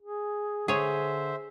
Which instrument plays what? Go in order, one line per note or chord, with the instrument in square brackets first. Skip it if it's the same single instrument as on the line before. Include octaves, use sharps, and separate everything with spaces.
[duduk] G#4
[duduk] D3 [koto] G#4 C#5 [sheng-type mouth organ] C5 E5